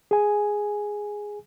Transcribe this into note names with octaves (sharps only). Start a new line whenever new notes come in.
G#4 G#5